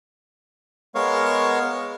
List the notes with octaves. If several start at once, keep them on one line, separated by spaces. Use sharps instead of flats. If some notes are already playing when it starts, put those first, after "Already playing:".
G#3 B3 A#4 C#5 F5 C#6